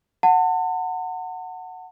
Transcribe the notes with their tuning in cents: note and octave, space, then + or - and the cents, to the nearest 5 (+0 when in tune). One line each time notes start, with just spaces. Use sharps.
F#5 +0 A5 +40